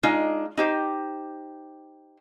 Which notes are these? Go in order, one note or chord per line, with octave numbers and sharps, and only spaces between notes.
G#3 D4 D#4 F4
D#4 G4 C5